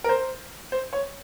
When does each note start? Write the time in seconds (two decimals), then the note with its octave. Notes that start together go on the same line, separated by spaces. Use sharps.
0.04 A#4
0.09 C5
0.72 C5
0.93 C#5